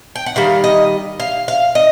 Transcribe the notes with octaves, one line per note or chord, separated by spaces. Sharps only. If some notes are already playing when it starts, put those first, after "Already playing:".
G5
F#5
D#3 G3 F5
D#5
F5
F5
D#5